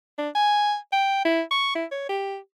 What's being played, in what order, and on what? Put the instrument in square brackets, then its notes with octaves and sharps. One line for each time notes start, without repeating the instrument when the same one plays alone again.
[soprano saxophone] D4
G#5
G5
E4
C#6
E4
C#5
G4